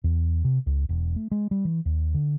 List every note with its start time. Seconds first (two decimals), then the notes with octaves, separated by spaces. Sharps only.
0.04 E2
0.44 C3
0.66 C#2
0.89 E1
1.16 A3
1.31 G#3
1.51 G3
1.65 E3
1.85 D#2
2.14 D3